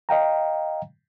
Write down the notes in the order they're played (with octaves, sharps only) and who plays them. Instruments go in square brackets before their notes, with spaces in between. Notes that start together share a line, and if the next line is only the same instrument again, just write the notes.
[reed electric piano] D#5 F5 G5 A#5